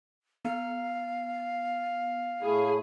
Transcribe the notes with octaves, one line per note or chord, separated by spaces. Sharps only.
B3 F5
A2 A3 E4 G#4